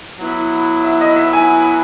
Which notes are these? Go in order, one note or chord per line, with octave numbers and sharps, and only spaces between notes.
F#3 B3 E4
E5
D#5
E5
G#5